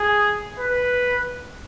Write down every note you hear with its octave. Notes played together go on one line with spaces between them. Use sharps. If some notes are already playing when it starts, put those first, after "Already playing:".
Already playing: G#4
B4